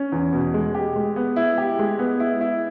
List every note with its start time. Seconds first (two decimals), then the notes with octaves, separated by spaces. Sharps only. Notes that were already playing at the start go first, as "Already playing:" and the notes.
Already playing: C#4
0.12 E2
0.33 B2
0.54 G#3
0.74 G4
0.96 G#3
1.16 B3
1.36 E4
1.58 G4
1.79 G#3
1.99 B3
2.20 E4
2.41 E4